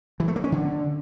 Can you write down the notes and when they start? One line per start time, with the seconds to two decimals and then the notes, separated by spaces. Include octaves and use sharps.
0.20 E3
0.28 A3
0.36 A#3
0.44 C#4
0.52 D3